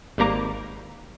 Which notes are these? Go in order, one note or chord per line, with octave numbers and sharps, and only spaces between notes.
G#1 G3 A#3 A#5 D6